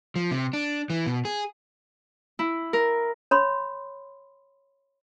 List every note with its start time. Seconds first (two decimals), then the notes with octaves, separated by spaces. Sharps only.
0.16 F3
0.31 C3
0.53 D4
0.90 E3
1.07 B2
1.25 G#4
2.39 E4
2.73 A#4
3.31 C#5 B5 C6